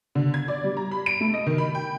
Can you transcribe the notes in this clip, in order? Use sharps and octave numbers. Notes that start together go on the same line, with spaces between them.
D3
G#6
D5
G3
A#5
B5
D7
A3
D#5
D#3
B5
G5